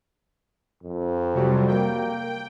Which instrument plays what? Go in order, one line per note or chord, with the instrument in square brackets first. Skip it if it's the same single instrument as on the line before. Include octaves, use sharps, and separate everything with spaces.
[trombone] F2
[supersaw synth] C3 F#3 G3
[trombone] A#3 [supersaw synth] G5